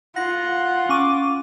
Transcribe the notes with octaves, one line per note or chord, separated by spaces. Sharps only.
F4 F#5 A#6
C#4 C#6 D6 D#7